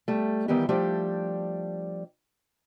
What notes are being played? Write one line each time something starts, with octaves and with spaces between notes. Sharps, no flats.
G3 A3
D#3 E3 G3 B3 G4
F3 G3 A3 D4 G4